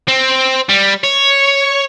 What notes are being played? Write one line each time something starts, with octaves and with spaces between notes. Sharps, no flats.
C4
G3
C#5